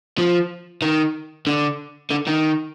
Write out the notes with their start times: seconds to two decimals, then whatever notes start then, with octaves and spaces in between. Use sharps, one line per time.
0.18 F3
0.82 D#3
1.47 D3
2.11 D3
2.27 D#3